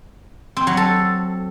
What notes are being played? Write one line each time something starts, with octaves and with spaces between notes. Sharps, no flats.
C4
F#3
A4